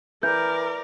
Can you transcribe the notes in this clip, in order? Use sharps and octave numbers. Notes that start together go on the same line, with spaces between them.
E3 A#4 D5 G6